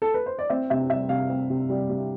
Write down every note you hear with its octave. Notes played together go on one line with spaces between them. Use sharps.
A4
B4
C5
D5
C4 E5
C3 E5
G3 E5
C3 F5
C4
C3
G3
C3